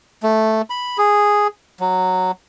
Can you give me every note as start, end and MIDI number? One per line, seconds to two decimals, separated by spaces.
0.23 0.62 57
0.70 0.98 83
0.98 1.47 68
1.80 2.31 54